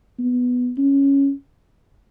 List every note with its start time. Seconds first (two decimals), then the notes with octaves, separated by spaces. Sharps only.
0.19 B3
0.78 C#4